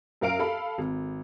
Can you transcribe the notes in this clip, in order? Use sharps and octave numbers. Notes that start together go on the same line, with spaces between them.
F#2 A#4 F5 D7
A4 F5 B5
G#1